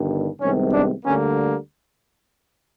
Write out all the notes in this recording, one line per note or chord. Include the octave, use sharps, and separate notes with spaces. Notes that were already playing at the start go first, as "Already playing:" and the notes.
Already playing: G1 G2 D#3
C2 C3 D#3 G#3 B3 C#4
D4
D2 D3 G3 A#3 C#4